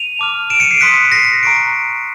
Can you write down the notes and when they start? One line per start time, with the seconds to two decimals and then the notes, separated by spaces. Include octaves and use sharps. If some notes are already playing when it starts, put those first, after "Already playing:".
Already playing: D#7 F7
0.19 A5 D6 F6
0.50 D7 E7
0.60 C#7 D#7
0.71 C7 D7
0.81 C6 D#6 F#6 B6 C#7
1.12 A#6 C7
1.43 A#5 C#6 F#6 C7 D7